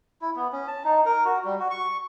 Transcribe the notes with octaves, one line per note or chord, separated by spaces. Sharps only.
E4
B3
C#4
A5
D#4
A#4
F#4
G3
F#4
C#6